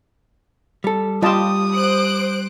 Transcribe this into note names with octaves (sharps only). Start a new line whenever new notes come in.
G3 A4
G3 F4 G4 D#5 A5 D#6
C5 F#6 D7